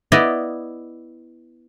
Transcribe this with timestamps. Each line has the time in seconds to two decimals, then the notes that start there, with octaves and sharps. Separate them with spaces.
0.12 B3 E4 D5 D#5